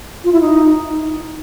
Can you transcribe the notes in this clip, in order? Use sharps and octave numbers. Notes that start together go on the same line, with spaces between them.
F4
E4
D#4